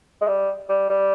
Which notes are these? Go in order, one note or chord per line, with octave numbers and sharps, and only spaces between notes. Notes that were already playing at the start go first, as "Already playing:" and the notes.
G#3
G3
G3
G3